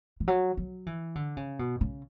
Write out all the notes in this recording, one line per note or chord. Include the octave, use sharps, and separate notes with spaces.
E3
F#3
F#3
E3
D3
C#3
B2
C#3